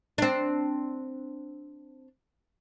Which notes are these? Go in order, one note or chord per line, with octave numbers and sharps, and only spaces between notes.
C4 D4